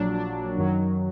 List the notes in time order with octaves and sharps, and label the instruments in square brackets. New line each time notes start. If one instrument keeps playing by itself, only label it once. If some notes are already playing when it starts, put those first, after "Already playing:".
Already playing: [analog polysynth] A#1 A#2 F#3 D4
D4
F#2 D#3 F#3